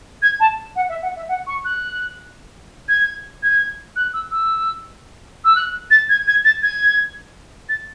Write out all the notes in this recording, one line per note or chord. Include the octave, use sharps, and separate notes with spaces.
G#6
A5
F#5
E5
F#5
E5
F#5
C#6
F#6
G#6
G#6
F#6
E6
E6
E6
F#6
A6
G#6
G#6
A6
G#6
A6